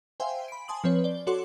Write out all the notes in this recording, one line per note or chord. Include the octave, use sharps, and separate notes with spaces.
C5 E5 F5 G5 G#5 C6
B5 D7
G#5 A5 C6 D#6 F#7
F3 C4 B4 C#5
D5 G7
F#4 A4 C#5 F#5 C6 D6